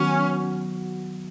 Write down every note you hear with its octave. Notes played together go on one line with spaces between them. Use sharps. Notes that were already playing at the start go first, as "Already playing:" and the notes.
Already playing: D#3 F#3 B3 C#4 F#4